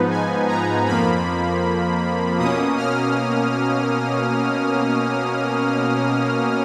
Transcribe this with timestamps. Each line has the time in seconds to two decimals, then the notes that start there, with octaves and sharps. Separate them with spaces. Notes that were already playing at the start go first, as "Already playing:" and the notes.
Already playing: G#2 F3 B3 D#4 B4
0.11 G#5
0.48 A#5
0.86 F2 F3 A#3 B5
2.38 B2 A#3 C#4 D#6
2.77 F6